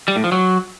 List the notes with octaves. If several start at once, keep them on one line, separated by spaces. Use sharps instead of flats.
G3
A2
F3
F#3